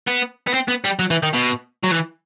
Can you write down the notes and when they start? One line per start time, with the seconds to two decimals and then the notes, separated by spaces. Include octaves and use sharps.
0.07 B3
0.47 B3
0.54 C4
0.68 B3
0.85 G3
0.99 F#3
1.11 E3
1.23 D#3
1.34 B2
1.83 F#3
1.91 E3